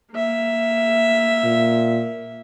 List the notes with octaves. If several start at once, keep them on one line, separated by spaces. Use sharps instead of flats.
A#3 E5
A#2